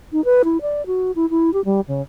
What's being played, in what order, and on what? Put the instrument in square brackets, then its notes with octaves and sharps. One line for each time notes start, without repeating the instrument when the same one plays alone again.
[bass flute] D#4
B4
E4
D5
F#4
E4
E4
G4
G3
C#3